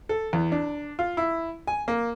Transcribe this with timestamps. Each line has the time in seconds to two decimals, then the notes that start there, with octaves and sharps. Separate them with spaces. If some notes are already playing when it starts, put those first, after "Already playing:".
0.09 A4
0.33 E2
0.52 D4
0.99 F4
1.17 E4
1.67 G#5
1.88 A#3